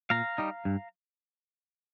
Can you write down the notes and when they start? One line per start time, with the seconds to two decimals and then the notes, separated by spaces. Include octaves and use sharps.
0.10 A#2 F5 A#5
0.38 G3 D#4
0.65 G2